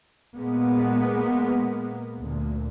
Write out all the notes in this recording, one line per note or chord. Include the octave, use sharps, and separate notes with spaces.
A#2 G#3 A#3 B3
D2 A#2